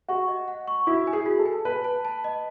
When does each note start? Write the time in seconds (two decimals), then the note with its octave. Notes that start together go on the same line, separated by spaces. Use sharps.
0.08 F#4 C#6
0.28 D#5
0.48 F#5
0.67 C#6
0.87 E4 F#4
1.07 G#5
1.13 G#4
1.26 F#4
1.39 A4
1.46 G#5
1.65 B4 A5
1.84 A5
2.05 A5
2.24 D#5